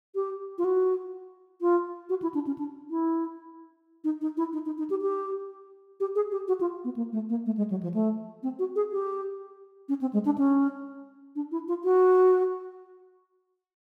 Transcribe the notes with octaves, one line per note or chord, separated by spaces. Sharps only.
G4
F4
F#4
F4
F#4
E4
D4
C#4
D4
E4
D#4
D#4
E4
D#4
D#4
D#4
G4
G4
G4
G#4
G4
F#4
F4
B3
A#3
A3
A#3
A3
G#3
F#3
F3
A3
C4
F#4
G#4
G4
C#4
C4
G#3
D4
C#4
D4
E4
F4
F#4